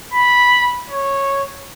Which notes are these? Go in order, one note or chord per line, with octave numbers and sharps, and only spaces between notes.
B5
C#5